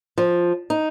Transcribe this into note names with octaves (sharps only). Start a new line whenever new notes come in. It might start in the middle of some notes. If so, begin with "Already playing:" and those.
F3
D#4